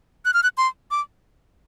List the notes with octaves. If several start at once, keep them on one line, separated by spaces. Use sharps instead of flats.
F#6
F6
F#6
C6
D6